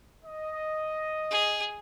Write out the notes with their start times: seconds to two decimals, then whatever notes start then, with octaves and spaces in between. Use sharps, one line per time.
0.24 D#5
1.31 G#4